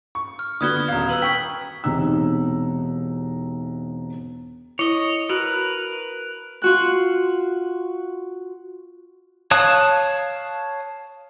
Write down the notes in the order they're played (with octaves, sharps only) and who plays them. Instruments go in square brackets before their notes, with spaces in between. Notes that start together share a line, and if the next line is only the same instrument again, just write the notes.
[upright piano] C#6
[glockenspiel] F6
[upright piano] D3 B3 F#4 [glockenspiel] D#6 G#6 G7
[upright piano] D#1 F5 [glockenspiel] A#5 G#6
[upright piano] B4 [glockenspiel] E6 F#7
[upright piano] G5 C#6 [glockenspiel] B6
[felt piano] E1 C3 D#4 E6
[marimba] E4 [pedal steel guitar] C#5 D#5
[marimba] F#4 [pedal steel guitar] A#4 B4
[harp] F4 F#4 F#6
[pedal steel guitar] C#5 F5 A5 D#6 F#6